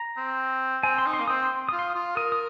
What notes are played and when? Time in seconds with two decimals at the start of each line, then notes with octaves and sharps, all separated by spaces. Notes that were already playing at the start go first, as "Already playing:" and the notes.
Already playing: A#5
0.17 C4
0.83 C4 G#5
0.98 C6
1.06 D#4
1.13 C6
1.20 A#3
1.28 C4 D#6
1.43 C6
1.69 F4 D#6
1.79 C6
1.90 D#6
1.95 F4
2.16 A#4 D#6
2.32 D#6